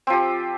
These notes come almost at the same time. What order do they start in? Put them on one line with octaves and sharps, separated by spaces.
C4 F3 G4